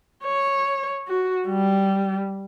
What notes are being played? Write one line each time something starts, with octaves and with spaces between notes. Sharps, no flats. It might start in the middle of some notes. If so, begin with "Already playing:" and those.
C#5
F#4
G3